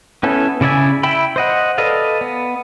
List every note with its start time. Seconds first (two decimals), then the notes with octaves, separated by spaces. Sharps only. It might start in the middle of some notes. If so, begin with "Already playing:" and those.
0.23 B3 C#4 E4 A4
0.61 C#3 E4 D5 E5 G#5
1.03 E4 E5 G5 B5
1.36 C5 D#5 F#5
1.78 A4 B4 D5 D#5 F5
2.21 B3